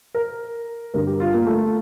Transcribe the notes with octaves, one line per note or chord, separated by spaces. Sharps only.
A#4
G2 D3 G3 A#4
G4
F4
A#3
A3